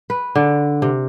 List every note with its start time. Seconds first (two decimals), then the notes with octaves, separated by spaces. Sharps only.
0.10 B4
0.35 D3
0.82 C3